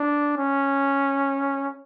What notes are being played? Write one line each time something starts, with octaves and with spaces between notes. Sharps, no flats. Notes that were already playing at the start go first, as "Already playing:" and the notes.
Already playing: D4
C#4